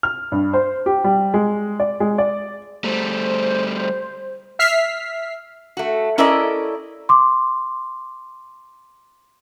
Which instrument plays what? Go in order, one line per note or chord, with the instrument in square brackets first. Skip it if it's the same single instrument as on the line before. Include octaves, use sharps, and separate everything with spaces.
[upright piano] F6
G2
C5
G4
G3
G#3
D5
G#3
D5
[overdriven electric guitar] G3 A3 [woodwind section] C5
[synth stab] E5 F6 B6 C7
[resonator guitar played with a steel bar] A3 F#4
C#4 E4 A4 A#4 D5 D#5
[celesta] C6 D6